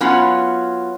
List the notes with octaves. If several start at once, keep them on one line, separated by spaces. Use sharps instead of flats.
F#3 B3 C#4 F4 F#5